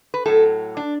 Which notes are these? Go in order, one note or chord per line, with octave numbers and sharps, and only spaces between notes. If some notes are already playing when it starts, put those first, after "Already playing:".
B4
A2 F#3 A4
D4